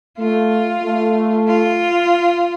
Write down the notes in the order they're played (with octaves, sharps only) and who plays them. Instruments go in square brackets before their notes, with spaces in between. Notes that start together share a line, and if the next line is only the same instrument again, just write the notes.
[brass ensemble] A3 [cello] F4
[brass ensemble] A3
[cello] F4